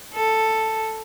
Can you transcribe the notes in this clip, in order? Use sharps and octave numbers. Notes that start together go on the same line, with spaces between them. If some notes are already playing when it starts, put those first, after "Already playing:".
A4